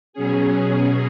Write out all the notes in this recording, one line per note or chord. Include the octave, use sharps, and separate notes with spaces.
B2 F#3 C#4 G#4